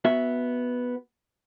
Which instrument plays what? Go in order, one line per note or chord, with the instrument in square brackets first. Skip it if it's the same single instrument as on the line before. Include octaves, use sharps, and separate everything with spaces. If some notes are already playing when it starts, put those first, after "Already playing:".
[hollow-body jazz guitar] B3 F#4 E5